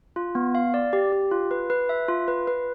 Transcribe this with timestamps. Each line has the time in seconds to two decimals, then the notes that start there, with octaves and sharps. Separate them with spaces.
0.16 F4
0.35 B3
0.55 F5
0.74 D5
0.93 G4
1.12 G4
1.31 F4
1.51 B4
1.70 B4
1.89 E5
2.08 F4
2.28 B4
2.47 B4